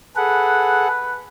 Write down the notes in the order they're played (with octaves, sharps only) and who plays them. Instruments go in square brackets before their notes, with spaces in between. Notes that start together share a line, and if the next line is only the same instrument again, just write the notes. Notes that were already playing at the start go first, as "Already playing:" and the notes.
[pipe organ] G#4 A4 F#5 [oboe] B4